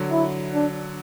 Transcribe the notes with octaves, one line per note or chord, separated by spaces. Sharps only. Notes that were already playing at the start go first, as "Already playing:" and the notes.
Already playing: D3 F#3
E4
D4